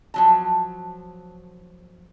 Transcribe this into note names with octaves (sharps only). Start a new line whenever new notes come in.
F3 F#3 A5